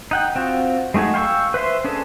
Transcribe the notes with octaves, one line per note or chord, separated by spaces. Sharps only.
D#4 F#5 G5
C4 F4 F#4
G#3 A3 D#4 F#4 G#4
F5 G5 C6 C#6 E6
B4 C5 E5 C6
C#4 D4 G#4 A4